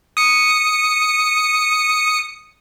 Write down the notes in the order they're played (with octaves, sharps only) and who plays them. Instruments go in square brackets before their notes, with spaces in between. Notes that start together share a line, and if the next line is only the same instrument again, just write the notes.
[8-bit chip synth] D#6 C#7